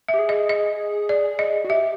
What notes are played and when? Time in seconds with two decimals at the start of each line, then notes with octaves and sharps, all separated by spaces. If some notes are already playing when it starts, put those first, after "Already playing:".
0.08 E5
0.14 G4
0.19 G#4
0.29 D#5
0.49 D#5
1.09 D5
1.39 D#5
1.64 F#4
1.69 G4 E5